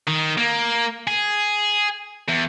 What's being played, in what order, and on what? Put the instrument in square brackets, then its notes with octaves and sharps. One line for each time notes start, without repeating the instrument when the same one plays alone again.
[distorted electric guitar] D#3
A#3
G#4
E2